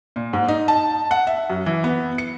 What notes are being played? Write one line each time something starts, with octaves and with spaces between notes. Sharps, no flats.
A#2
G#2
D#4
A5
F#5
E5
F#2
E3
B3
C#7